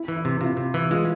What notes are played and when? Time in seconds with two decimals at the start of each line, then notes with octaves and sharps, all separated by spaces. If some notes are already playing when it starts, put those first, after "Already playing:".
Already playing: E4
0.08 E3
0.16 E4
0.25 C3
0.41 C3 F4
0.57 C3
0.74 E3
0.91 G#3 F4